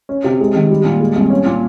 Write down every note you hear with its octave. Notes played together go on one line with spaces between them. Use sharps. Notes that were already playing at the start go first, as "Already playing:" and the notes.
C#4
C3
G#3
D#3
G3
A#2
G#3
C2
C#4
A#2